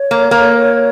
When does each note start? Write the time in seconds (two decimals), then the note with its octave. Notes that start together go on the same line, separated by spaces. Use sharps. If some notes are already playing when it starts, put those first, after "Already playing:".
Already playing: C#5
0.11 A#3
0.31 A#3